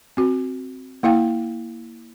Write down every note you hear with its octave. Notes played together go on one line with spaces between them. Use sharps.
C4 F#4
A#3 E4 F5 G5